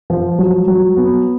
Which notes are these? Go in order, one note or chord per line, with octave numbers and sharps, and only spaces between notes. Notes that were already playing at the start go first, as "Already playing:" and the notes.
F3
F#3
F#3
B3